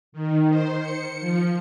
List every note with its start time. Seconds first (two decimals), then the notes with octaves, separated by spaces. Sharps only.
0.12 D#3
0.49 C5
0.79 C#7
1.20 F3